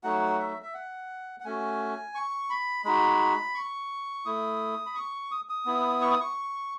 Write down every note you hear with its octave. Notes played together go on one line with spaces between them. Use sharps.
F#3 A3 D#4 F#4 F#5
E5
E5
F#5
F#5
A3 C#4 F#4 G#5
C#6
B5
G#3 D#4 F#4 B5
C#6
A3 E4 D#6
B5
C#6
D#6
D#6
B3 E4
C#6
D#6
C#6